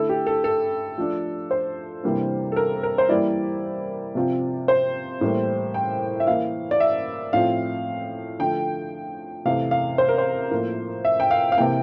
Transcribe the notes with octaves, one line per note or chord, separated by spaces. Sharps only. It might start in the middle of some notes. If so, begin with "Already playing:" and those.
Already playing: D3 A3 E4 A4
G4
A4
A4
F3 A3 D4
C5
C3 E3 G3 A#3 D4
A4
A#4
A#4
C5
E3 G3 A#3 E4 D5
C3 F3 C4 F4
C5
A2 E3 G3 A#3
G5
E5
E3 A#3 E4 F5
D5
E5
A2 F3 C4 F4 F5
D3 F3 A3 G5
C3 E3 A3 F5
F5
C5
A#4
C5
A2 F3 A#3 F4
E5
G5
F5
F5
C3 E3 A#3 G5